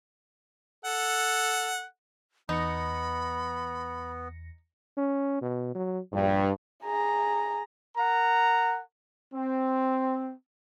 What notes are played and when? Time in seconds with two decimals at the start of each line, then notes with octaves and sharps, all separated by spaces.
0.85 A4 F#5
2.49 E2 B3 D#4 B5 A#6 C#7
4.97 C#4
5.42 B2
5.75 F#3
6.13 A#1 G2
6.85 G#4 A#5
7.97 A#4 F#5 A#5
9.34 C4